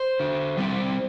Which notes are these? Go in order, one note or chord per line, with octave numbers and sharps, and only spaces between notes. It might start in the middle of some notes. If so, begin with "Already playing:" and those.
Already playing: C5
D3
G3 C4 E4